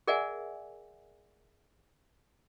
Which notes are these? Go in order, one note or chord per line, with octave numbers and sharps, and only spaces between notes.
G#4 A#4 D5 E5 F#5 G#5